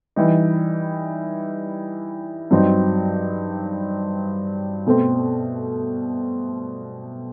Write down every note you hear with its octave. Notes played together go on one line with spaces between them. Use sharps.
E3 G3 D#4
G2 F#3 C4 D#4
B2 A3 C4